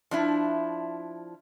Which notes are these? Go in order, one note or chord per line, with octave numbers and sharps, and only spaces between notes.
F3 D4 E4